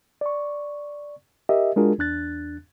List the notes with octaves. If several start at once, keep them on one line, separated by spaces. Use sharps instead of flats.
D5 C#6
G4 A#4 D#5 E5
G#3 D4 F4 F#4 G#4 A#4
E2 D4 F#6 A6